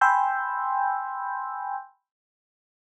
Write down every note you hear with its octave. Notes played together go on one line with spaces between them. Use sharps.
G5 G#5 B5 C6 E6 G6